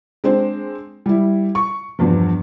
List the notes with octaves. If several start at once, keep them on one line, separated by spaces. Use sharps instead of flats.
G#3 C4 D4 C5
G3 E4
C#6
E2 G2 F3